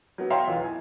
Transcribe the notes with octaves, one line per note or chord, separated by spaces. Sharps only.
F#3 B3
C#5 E5 F5 G5 A#5 C6
B1 E3 F4
G#5